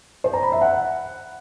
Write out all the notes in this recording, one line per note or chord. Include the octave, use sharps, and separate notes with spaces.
C5
A#5
B5
E5
F#5